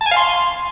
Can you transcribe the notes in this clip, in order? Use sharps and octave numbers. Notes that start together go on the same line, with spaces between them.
A5
G#5
F5
C6